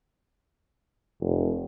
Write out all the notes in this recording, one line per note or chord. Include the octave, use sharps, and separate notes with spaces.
F1